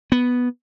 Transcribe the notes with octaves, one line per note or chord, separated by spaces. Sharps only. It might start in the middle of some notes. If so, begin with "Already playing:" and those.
B3